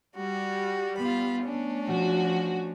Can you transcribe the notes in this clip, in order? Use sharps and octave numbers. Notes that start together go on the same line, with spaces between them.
G3 F#4
B3 F4 B5
A3 C#4 D4
F3 F#4